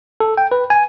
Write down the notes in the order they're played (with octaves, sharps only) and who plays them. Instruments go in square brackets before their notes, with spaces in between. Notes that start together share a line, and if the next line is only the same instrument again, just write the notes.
[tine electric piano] A4
G5
B4
G#5